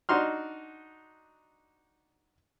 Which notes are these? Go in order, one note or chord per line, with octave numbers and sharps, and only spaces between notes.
D4 D#4 F#4 C6 F6